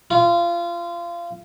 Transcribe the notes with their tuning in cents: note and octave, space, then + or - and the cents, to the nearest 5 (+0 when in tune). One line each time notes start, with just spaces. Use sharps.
F4 -25